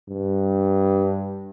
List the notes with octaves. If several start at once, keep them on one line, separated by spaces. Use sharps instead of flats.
G2